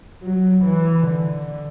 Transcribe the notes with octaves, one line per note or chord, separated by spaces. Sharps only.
F#3
E3
D3